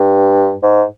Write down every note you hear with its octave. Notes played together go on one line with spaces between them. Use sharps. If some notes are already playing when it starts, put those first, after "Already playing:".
Already playing: G2
G#2